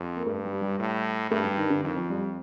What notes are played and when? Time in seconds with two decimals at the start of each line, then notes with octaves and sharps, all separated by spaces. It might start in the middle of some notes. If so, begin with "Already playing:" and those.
Already playing: F2
0.16 A#3
0.26 G2 A3
0.45 G3
0.62 G3
0.79 A2
1.31 G2 A3
1.44 G3
1.57 D#3
1.70 D3
1.84 F2 D#3
1.97 F3
2.10 G3